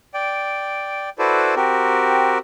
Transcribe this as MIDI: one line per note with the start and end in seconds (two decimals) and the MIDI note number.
0.14 1.10 74
0.14 1.10 79
1.19 1.55 64
1.19 1.55 66
1.19 1.55 69
1.19 1.55 71
1.19 1.55 72
1.19 1.55 74
1.56 2.38 60
1.56 2.38 66
1.56 2.38 67
1.56 2.38 70